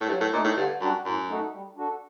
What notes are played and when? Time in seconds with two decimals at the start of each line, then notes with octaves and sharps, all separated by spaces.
0.01 A2
0.09 G2 F#3
0.21 A2
0.33 A#2 A3 D#4
0.44 A2
0.57 G2 D3
0.81 F#2 G3 D4 F#4
1.05 F#2 A2
1.28 A3 D#4 F#4 A4
1.53 G3
1.76 D4 F#4 A4